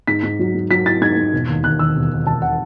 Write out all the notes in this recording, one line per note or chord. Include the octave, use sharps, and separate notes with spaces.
G#2 B6
G#2
F#3
G#2
F#3 B6
E4 A6
G#2 G#6
G#2
E1
D#2
D#2 F#6
D#3 E6
E1
E1
E1 A5
F#5